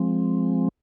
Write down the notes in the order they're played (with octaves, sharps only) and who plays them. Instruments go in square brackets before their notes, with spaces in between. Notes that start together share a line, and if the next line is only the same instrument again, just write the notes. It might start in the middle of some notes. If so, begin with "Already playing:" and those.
Already playing: [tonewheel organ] F3 G#3 C4